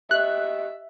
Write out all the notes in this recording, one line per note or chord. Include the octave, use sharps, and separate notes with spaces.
G4 D#5 E5 F#6